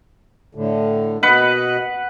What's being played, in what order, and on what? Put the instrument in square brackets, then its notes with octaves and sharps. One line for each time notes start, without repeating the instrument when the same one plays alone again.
[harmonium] A2 D3
[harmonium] B2 D#5 [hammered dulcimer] B4 F#5